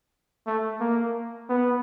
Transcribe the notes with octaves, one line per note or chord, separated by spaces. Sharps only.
A3
A#3
B3